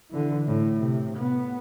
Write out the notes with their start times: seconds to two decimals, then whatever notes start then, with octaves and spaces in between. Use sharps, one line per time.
0.11 D3 E3
0.47 A2
0.80 C3
1.18 B3